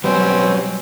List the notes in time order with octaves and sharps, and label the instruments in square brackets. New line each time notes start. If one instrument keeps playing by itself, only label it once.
[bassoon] B2 [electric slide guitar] F#3 G3 [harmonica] C4 C#4